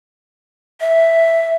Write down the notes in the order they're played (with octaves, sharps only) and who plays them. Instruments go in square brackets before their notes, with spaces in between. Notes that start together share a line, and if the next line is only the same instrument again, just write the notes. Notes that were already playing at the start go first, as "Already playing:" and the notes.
[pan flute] E5